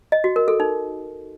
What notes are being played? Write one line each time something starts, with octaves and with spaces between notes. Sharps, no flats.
D#5
F#4
A#4
A4
D#4